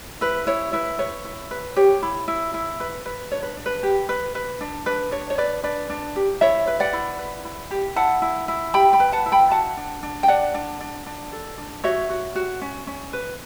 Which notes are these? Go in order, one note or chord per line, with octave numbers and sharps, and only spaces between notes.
E4 B4
E4 C#5
E4 B4
B4 C#5
E4
B4
G4 C#5
E4
E4
E4
B4
B4
D4 C#5
B4
D4
B4
G4
B4
B4
D4
D4 B4
D4 C#5
C#5
D4 B4 D5
D4 B4 D5
D4
G4
E4 C#5 E5
B4
D5 F#5
E4
B4
E4
G4
E4 F#5 A5
E4
E4
G4 G5 B5
G5 B5
B4
F#5 A5
E4
G5 B5
F#4 F#5 A5
D4
D4
G5
D4 D5 F#5
D4
D4
D4
A4
D4
F#4 C#5 E5
F#4
F#4
C#4
C#4
B4